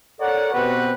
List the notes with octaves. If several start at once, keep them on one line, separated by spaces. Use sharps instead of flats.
A4 A#4 C#5 D5 F#5
B2 C4 F#4 G4 B4 F#5